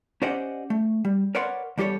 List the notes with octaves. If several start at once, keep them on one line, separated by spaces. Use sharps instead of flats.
C#4 G4 C5 D5 D#5 F#5
A3
G3
A#4 B4 C#5 D5 F#5 C6
E2 G3 G4 A4 C#5